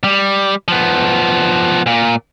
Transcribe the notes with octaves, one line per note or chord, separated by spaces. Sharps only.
G3
F3 B3
A#2